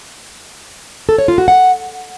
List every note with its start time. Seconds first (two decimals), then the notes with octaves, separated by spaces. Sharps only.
1.09 A4
1.18 C#5
1.28 F4
1.38 F#4
1.48 F#5